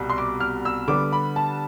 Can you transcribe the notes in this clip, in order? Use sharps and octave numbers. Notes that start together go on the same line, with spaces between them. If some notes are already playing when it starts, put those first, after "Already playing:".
Already playing: C2 B2 G3
C6
D6
F6
E6
D3 G3 B3 D6
B5
A5